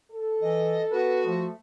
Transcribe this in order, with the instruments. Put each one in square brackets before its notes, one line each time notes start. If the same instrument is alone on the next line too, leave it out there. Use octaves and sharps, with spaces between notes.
[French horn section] A4
[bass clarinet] E3 [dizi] D#5
[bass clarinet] B3 [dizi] F#4 [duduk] B4
[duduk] F3 [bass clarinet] A3